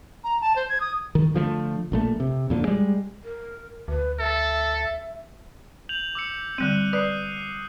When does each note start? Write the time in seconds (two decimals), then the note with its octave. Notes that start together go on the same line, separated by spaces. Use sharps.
0.24 A#5
0.41 A5
0.56 C5
0.69 G#6
0.80 D#6
1.15 D#3
1.34 D3 F3 G#3 A3
1.92 A#1 A#2 A3
2.20 C3
2.50 F2 A#2 D3
2.64 G3 G#3
3.24 A#4
3.88 D2 B4
4.19 A4 E5
5.89 G6 F7 F#7
6.15 D6 E6 C#7
6.58 D3 G3 C4 F#6 D#7
6.93 B4 D5 D#6 F#6 C7